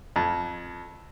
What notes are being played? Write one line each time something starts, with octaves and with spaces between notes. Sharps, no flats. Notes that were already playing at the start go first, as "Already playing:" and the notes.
F2